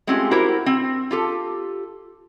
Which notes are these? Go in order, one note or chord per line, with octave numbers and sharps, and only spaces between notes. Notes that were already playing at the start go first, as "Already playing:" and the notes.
G#3 A3 C4 C#4 F4 G4
E4 F#4 G4 A#4 C5
C4
F4 G4 A4